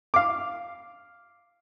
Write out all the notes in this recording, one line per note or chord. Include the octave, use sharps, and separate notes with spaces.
F5 D6